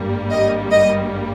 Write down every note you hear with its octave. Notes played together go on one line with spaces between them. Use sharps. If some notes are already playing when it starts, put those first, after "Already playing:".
Already playing: G#1 G2 G3 A#3
D#5
D#5